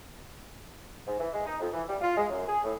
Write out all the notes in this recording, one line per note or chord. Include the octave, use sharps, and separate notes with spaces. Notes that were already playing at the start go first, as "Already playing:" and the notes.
G#2
E3
G#3
D#4
F2
E3
G3
F4
G#3
F#2
G#4
A2